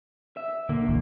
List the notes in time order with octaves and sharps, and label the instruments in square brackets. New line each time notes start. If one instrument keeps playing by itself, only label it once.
[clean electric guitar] E5
[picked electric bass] D3 [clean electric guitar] A#3
[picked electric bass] D1 B1 E3